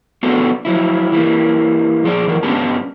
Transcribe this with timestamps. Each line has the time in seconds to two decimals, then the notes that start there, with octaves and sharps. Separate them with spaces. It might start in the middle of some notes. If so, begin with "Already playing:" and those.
0.23 B3 D4 F#4 A4 B4
0.65 F3 F#3 E4
1.12 E3 G3 A#3
2.04 A#2 F3 G#4 C5 D5
2.26 F#2 E3 A#4
2.43 G2 B3 C#4 D4 G4 A5